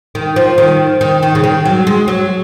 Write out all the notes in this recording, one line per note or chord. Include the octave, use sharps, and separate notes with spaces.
D#3
F3
D#3
D#3
D#3
C#3
D#3
F#3
G#3
F#3